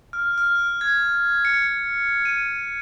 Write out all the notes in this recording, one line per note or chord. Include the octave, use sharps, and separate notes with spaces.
F6
F6
G#6
C#7
D#7